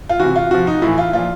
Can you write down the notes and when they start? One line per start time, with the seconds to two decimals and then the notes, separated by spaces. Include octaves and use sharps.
0.10 F4
0.19 C3 E3 F#4
0.36 F4
0.51 C3 F3 F#4
0.67 D#4
0.82 A2 E3 E4
0.98 F4
1.13 A#2 F3 F4